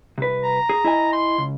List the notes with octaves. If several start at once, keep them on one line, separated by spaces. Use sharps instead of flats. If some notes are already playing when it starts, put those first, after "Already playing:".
C2 B4
A#5
G#4
E4 D#5 G#5
C6
C#2